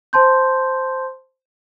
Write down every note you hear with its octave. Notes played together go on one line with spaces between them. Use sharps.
C5 A5 C6 G6